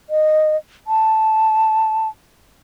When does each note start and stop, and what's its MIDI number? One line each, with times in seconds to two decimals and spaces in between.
0.10 0.57 75
0.87 2.08 81